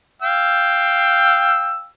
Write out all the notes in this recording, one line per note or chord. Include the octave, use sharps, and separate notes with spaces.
F5 G5 E6